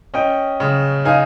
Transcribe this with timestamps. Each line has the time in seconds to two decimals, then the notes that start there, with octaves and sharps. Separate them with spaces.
0.14 C#4 D#5 G5
0.60 C#3
1.05 D#4 F5 G#5